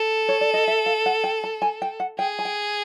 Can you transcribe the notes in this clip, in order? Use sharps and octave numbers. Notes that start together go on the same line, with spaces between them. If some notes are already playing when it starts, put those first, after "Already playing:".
Already playing: A4
C#5
D5
D#5
E5
F5
F#5
G5
A5
G#5
G5
F#5
G#4 G5
G#5
G5